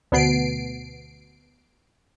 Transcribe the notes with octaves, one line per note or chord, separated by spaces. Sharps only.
D2 B2 B3 C7 D7